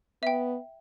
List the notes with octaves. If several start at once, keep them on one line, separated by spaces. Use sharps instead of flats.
B3 E5 G5